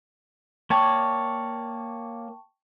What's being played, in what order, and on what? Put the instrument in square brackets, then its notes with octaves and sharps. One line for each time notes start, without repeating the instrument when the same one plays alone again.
[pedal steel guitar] A#3 C#5 D5 [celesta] G5 A5 C#6